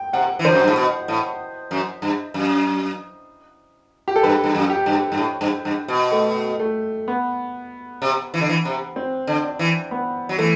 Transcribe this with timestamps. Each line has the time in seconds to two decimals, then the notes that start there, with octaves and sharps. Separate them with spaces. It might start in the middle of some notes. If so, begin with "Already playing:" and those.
Already playing: G5
0.13 C3 F#5
0.39 E3
0.44 D3 C5
0.52 F#2
0.61 G2
0.68 A2
0.76 B2
1.08 A2
1.71 F#2
2.02 G2
2.34 F#2
4.08 G4
4.16 A4
4.23 G2 B4
4.44 G2
4.55 F#2
4.70 G4
4.86 G2
5.12 G2
5.18 A2
5.41 G2
5.65 G2
5.88 B2
6.12 A3
6.60 A3
7.08 B3
8.02 C3
8.34 E3
8.41 D3
8.49 E3
8.65 C3
8.96 C4
9.27 D3
9.44 D4
9.59 E3
9.91 B3
10.29 F#3
10.38 E3 A3